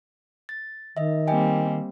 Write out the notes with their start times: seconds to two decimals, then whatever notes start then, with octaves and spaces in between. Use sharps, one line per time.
0.49 A6
0.97 D#3 D#5 E5
1.28 G3 A#3 C4 D#5 G5 G#5